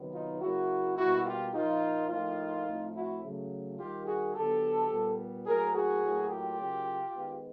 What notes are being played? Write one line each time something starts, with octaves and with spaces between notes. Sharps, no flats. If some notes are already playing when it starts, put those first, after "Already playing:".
Already playing: C3 D#3 F#3 B3
D#4 F4
C#3 F#3 A#3 E4 F#4
B2 G3 A#3 E4 F#4
F4 G4
A#2 F3 A#3 D#4 F4
A2 F3 A#3 D#4 F4
A2 F3 A3 C4
E4 F#4
C#3 F#3 A3
D#3 G3 A#3 F4 G4
F#4 G#4
D3 F#3 B3 G4 A4
A#2 G3 B3
A2 F#3 A#3 G#4 A#4
F#4 G#4
A2 F#3 A#3
F4 G4
C#3 F#3 A#3
D#3 G#3 B3